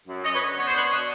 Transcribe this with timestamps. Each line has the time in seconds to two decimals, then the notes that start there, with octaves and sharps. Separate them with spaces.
0.08 F#2
0.25 F#2 C#5 D#5
0.35 B4 C#5
0.41 D3
0.58 B3 C#5
0.67 C5
0.75 D4 B4 C#5
0.91 B2 C#5 D#5